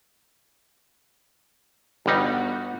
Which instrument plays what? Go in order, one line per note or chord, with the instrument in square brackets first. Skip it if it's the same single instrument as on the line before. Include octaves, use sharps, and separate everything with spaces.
[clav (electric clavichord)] G1 G3 D#4 [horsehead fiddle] B3 F#4